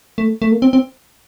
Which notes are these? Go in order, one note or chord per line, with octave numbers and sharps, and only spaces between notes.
A3
A3
A#3
C4
C4